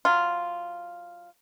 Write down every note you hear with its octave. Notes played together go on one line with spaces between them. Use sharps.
F#3 F4